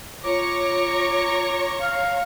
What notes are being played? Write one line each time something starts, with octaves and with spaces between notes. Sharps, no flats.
F4 C#5 A#5 C#6 D6
F5